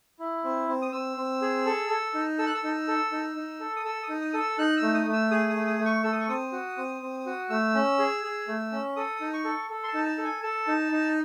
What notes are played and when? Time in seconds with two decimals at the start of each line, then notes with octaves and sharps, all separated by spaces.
0.19 E4
0.44 C4
0.68 C4
0.82 D#6
0.92 C4 E6
1.17 C4
1.42 G#4
1.66 A4
1.89 A4
2.14 D#4
2.39 A4 E6
2.46 F#6
2.54 E6
2.64 D#4
2.88 A4
3.12 D#4
3.36 D#4
3.60 A4
3.76 D#6
3.85 A4 E6
4.03 D#6
4.09 D#4
4.21 D#6
4.33 A4 D#6
4.40 E6
4.58 D#4 F#6
4.77 E6
4.82 A3
4.94 D#6
5.07 A3
5.13 E6
5.31 G#4 D#6
5.49 D#6
5.56 A3
5.67 D#6
5.79 A3
5.85 C#6
6.04 A4 E6
6.12 D#6
6.20 C#6
6.29 C4 D#6
6.52 F#4
6.77 C4
7.02 C4
7.26 F#4
7.50 A3 E6
7.75 C#4
7.99 G#4
8.24 G#4
8.48 A3
8.72 C#4
8.96 A4 D#6
9.21 D#4
9.33 C#6
9.45 A4
9.70 A4
9.83 C6
9.88 A5
9.94 D#4
10.06 A5
10.18 A4
10.24 G#5
10.43 A4 A5
10.68 D#4
10.92 D#4